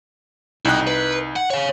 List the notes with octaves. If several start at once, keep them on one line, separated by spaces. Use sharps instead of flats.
C2 D#4 E4 G5 F#6
B4
F#5
C#5 F5